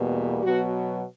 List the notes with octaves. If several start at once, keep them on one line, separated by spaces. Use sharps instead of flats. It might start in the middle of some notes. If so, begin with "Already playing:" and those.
Already playing: E2 B2 G3 A#3
B2 F#3 B3 F#4